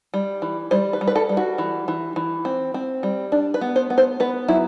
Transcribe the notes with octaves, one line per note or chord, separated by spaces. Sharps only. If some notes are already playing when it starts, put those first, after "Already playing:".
G3
E3
G3 C5
B4
G3
B4
A4
G3
F#4
E3
E3
E3
C4
C4
G3
D4
B4
B3
C5
B3
C5
B3 B4
F#3 E4